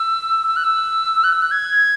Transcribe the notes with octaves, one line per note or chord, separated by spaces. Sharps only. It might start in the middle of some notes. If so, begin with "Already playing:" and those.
Already playing: E6
E6
F#6
E6
F#6
E6
F#6
G#6